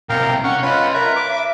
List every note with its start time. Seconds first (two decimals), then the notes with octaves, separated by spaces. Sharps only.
0.09 B1 C3 A#4 F5 G5
0.44 C#4 F#5 C#6
0.63 F4 B4 C#5 D#5
0.94 A#4 B4 E5
1.16 D6